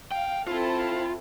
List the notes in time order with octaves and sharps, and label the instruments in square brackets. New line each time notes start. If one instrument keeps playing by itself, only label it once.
[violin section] F5 [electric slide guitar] G5
[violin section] C4 E4 A4 [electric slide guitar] F4